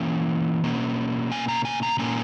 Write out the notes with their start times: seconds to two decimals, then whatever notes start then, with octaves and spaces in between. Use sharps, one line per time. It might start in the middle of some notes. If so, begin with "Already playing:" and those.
Already playing: E3 A#3 C#4 G#5
0.63 B2 A#3 C#4
1.32 G#5
1.48 A#5
1.65 G#5
1.83 A#5
1.99 A#2 A#3 C#4 G#5